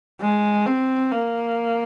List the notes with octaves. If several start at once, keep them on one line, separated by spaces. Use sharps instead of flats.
G#3
C4
A#3